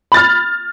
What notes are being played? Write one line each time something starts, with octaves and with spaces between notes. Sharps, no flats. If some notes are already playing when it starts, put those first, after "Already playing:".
B5 F6 A6